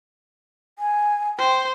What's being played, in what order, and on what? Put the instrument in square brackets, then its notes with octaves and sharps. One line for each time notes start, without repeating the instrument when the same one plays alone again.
[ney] G#5
[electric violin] C5 [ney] G5